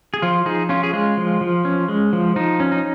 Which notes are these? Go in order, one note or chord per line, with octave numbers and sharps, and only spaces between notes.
G#4
F3 F4
F3 D#4 G#4
C#4 F4
G#4
G#3 F4
F3
F3
C#4
G#3
F3
F3 D#4
C#4
D#4